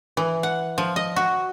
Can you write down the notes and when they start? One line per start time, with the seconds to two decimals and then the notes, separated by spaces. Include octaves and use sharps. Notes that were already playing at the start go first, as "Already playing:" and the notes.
0.17 E3
0.43 F#5
0.78 F3
0.96 D#5
1.16 F#4